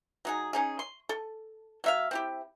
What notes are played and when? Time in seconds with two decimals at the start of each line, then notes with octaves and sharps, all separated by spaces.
0.25 F#3 D#4 G#4
0.53 C#4 D#4 G#4
0.79 C6
1.09 A4
1.84 F#3 E5 F5
2.11 C4 E4 G4